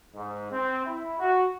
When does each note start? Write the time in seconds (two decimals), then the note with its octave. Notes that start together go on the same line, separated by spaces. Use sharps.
0.15 G#2
0.52 C4
0.86 E4
1.20 F#4